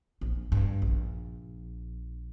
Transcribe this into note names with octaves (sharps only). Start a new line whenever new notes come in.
A#1
G2
A#1